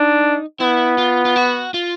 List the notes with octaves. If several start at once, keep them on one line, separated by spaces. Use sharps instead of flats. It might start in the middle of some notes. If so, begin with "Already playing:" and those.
Already playing: D4 D#4
B3 E4
F4
F4
F#4
F4